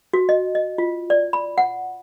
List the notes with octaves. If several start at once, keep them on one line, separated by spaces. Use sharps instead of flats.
F#4
D#5
D#5
F4
D5
B5
F#5